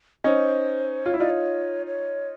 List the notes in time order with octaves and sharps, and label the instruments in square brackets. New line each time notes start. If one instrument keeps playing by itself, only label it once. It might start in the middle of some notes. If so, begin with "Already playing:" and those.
[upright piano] C#4 D#4 [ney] C#5
[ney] C5
[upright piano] F4 [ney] C#5
[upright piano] E4
[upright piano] D#4 F4 [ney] D5
[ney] C#5
C#5